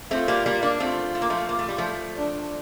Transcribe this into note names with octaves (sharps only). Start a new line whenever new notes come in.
A3 C4 F4
G3 A#3
G3 A#3
A#3 D4
A3 C4 F4
A3
A#3
F3 A3
A#3
A3
G3
F3 A3
D4